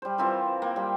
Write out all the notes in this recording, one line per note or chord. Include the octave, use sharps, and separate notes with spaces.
G3 C5
E3 C4 F4 A#4
A#3
G3 G5